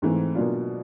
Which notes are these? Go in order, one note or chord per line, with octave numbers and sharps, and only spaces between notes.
G#2 E3 A3 C4
B2 F#3 A#3 D4 F4